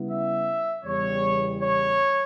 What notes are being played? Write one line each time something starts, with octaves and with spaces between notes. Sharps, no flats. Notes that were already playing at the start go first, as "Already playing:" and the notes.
Already playing: C#3 G3 B3 E4
E5
E2 C#3 G3 C#5
C#5